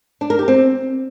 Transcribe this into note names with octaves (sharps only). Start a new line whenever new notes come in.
D4
A#4
G4
C4